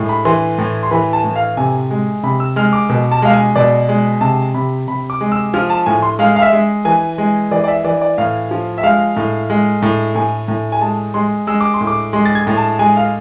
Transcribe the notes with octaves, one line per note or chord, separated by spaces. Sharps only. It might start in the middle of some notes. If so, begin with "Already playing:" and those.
Already playing: A2 G#3
B5
E3 C6
A2
C6
E3 B5
A5
A2
F5
C3 G#5
G#3
C3 B5
E6
G#3 F6
D6
B2
A5
G#3 F5
G#5
B2 D5
G#3
C3 A5
C3 B5
C3 B5
D6
G#3
E6
F3 F6
A5
A2 G#5
C6
G#3 F5
F5
E5
G#3
E3 G#5
G#3
E3 D5
D5
E5
E3 D5
D5
A2 F5
F3
E5
G#3 F5
A2
G#3
A2
A2 G#5
A2
G#5
G#3 A5
G#3 C6
G#3 E6
D6
C6
A2
D6
G#3 C6
A6
G#6
A2
A5
G#3 G#5
F5